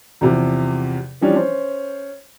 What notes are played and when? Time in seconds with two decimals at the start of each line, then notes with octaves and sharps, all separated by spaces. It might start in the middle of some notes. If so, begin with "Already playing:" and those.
0.21 E2 C3 F3
1.21 E3 F3 G3 C#4 D4
1.35 C#4 C5